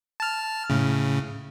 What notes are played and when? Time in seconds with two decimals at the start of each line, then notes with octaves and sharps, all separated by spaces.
0.20 A5 F6
0.70 A2 C#3